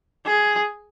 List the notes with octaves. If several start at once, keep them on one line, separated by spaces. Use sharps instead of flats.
G#4